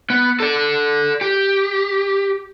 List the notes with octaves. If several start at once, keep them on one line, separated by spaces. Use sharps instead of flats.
B3
A4 D5
G4